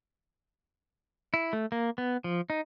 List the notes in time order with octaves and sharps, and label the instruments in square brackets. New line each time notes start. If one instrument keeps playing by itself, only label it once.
[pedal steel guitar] E4
A3
A#3
B3
F3
D#4